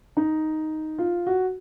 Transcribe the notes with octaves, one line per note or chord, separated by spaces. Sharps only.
D#4
F4
F#4